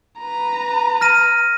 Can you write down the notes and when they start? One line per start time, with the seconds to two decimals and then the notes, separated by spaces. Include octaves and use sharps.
0.19 B4 A#5
1.01 F6 A#6 D#7